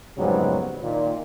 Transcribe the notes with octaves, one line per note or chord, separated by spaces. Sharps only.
F2 G#2 C#3 F#3 G3 B3
A#2 D#3